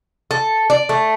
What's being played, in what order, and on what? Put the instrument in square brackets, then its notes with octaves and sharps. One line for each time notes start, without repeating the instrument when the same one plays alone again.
[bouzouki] A4
D5
A3